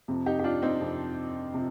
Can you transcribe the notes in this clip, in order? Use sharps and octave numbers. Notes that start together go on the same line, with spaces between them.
F2 C3 F3
D#4 G4
G4
D4 F4
C4 D#4
F2 C3 F3
C3 F3